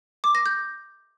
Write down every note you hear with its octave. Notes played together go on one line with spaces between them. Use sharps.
D6
A#6
G6